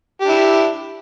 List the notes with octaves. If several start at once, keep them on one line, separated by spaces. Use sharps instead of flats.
D4 E4 G4